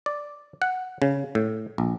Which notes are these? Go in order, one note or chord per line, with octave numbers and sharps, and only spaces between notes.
D5
F#5
C#3
A2
A#1